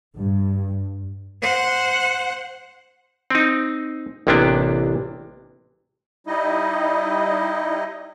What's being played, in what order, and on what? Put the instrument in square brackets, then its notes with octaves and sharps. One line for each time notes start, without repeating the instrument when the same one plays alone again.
[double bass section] G2
[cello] C5 F#5
[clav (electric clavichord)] C4 D#4
A1 C3 A#3 B3 D4
[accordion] G3 D#4 E4 D#5